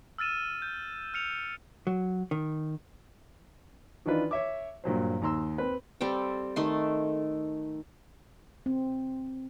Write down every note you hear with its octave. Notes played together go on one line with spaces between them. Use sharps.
E6 F6 A6 D#7 E7
G6
F6 C#7 F7
F#3
D#3
D#3 E3 D4 D#4 F4 B4
C#5 E5 D6
G2 A#2 F#3 C5
D#2 D#3 A#5 C6 E6
C4 B4
G3 C4 A4 G5
D#3 A3 C6
C4